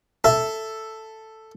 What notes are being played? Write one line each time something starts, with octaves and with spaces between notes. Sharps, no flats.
A4 E5